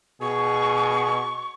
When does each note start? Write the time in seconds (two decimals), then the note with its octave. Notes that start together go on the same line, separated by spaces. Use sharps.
0.22 B2 G#4 C#6